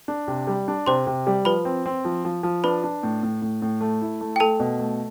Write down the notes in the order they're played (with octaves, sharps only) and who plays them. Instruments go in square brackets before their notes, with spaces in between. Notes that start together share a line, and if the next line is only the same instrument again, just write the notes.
[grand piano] D4
C3
G3
D4
[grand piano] C3 [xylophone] C5 C6
[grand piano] C3
G3
[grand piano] F3 [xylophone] B4 B5
[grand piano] C4
C4
F3
F3
F3
[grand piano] D4 [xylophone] B4 B5
[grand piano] D4
A2
A2
A2
A2
A3
E4
A3
[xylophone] G5
[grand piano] A3 [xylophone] A4 A5
[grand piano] B2
A3